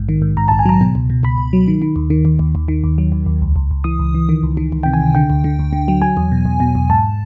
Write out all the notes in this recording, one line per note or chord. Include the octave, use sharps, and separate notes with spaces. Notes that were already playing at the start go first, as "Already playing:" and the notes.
Already playing: A#1 G#2
D#3
G#2
G#2 A#5
A5
A#1
G#5
F#3 A#5
B2
C#2
B2
C#2 B5
C#2
F#3
D#3
D#3
D#2
D#3
D#2
D#2
D#2
D#3
D#2
F#3
D#2
D#2
C#2
C#2
C#2
E3 D#6
C#2
E3
D#3
C#2
D#3
C#2
C3 G5
G#5
C#2
D3 G5
D2
D3
D2
D3
F#3
F#3 G#5
E2
B2
E2
B2
E2
G#2 A5